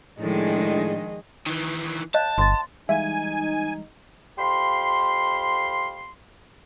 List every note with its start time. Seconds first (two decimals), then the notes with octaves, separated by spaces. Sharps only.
0.20 A2 D#3 F3 G#3 D4 G#4 D#5
1.46 D#3 E3
2.14 C#5 D#5 F5 A5 F#6
2.38 G1 C6 A6
2.89 E3 G3 G#3 D#4 E5 F5 G#5
4.38 F2 G4 F5 B5 C6